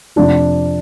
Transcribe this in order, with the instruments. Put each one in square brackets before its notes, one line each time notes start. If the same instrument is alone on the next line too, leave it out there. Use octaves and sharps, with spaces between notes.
[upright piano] F1 F2 C3 F3 D4